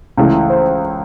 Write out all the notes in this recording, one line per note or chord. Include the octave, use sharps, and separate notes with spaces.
C#2 C#3 E3 A3
C5